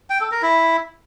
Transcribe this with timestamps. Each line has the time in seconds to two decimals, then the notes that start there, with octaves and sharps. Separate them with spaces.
0.10 G5
0.21 A4
0.32 A#4
0.42 E4